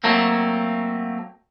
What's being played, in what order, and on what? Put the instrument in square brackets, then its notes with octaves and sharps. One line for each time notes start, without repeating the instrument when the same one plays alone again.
[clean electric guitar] F#3 A3 A#3 C4